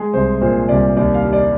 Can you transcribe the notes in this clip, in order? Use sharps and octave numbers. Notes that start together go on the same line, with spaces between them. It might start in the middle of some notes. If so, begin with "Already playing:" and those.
Already playing: G#3 G#4
C2 C5
A#2 C5
C2 D5
D#2 D5
F5
G3
D5